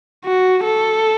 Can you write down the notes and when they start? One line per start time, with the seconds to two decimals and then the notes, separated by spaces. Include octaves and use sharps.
0.25 F#4
0.64 A4